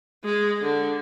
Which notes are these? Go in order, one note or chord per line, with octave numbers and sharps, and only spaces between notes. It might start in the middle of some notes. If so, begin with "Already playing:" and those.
G#3
D3